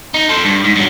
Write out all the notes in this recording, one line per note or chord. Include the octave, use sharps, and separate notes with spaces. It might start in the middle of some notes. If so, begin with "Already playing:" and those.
D#4
A4 C5
G2
G#2
G2 F#3